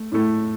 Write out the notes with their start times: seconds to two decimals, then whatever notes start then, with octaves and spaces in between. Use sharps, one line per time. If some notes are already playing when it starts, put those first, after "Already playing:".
Already playing: A3
0.12 A2 A3